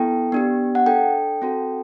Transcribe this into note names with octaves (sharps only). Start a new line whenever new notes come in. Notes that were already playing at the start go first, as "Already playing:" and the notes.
Already playing: B3 E4 A4 G5
B3 D4 G4
F#5
D4 A4 G5
C4 F#4 A4